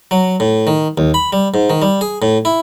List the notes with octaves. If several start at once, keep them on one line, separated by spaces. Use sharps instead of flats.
F#3
A2
D#3
D#2
B5
G3
G#2
D#3
G3
G#4
A2
E4